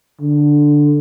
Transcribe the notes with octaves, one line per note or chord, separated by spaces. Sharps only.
D3